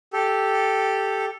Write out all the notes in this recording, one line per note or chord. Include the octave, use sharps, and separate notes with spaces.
G4 A4